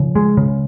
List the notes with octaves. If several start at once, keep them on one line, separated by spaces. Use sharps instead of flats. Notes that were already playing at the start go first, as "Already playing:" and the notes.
Already playing: C#3 F3
G#3
C#3